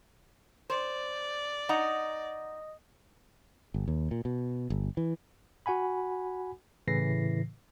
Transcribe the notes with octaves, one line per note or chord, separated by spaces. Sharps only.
C5 D5
D#4 D#5 F#5 A#5 D#6 A#6
G1
D#2
A#2
B2
G1
E3
F#4 F#5 G#5 B5
A2 C#3 E3 A#6 C7